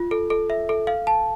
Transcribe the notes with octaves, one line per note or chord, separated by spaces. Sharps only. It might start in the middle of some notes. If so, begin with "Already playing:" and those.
Already playing: F4
A4
A4
E5
A4
F5
A5